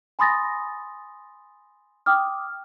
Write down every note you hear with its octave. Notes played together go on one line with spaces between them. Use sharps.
G#5 B5 C6 D#6 A6 A#6
G5 D6 D#6 F6